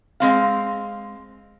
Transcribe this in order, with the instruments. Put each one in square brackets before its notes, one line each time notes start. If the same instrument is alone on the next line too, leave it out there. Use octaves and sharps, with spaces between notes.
[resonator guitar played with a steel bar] G#3 C4 F5